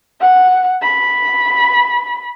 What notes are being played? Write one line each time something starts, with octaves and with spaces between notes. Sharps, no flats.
F#5
B5